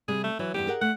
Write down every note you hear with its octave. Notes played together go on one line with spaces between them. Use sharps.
C3 G3 G#4
A3
E3 F#3
E2 G2 B3 G4
G#4 A#4 F#5
A3 F#5